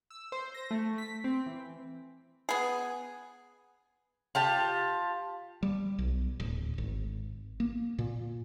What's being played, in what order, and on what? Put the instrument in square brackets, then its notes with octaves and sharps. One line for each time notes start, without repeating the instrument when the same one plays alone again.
[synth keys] E6
C5
A#6
A3
B6
C4
E3
[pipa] B3 G#4
[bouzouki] F4 G4 A5
[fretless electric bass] G3
B1
D1
G#1
A#3
A#2